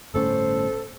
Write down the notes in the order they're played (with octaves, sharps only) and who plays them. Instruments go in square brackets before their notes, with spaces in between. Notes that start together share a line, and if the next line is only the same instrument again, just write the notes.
[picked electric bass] G1 A2 C#4 [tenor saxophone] A4 [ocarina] C5